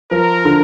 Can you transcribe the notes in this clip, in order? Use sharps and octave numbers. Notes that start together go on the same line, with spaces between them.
F3 A#4
D3